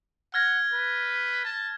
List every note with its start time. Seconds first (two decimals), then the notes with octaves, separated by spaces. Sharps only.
0.34 F#5 F6 G#6 A#6
0.73 B4
1.45 A5